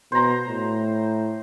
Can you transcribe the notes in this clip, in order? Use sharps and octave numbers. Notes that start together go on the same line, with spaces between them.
B2 C5 A#5
A2